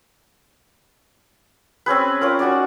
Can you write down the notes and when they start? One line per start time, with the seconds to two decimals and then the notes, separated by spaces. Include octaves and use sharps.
1.86 C4 C#4 G#4 B4
2.21 C#4 F4 A#4
2.39 D#4 F#4 G#4 D5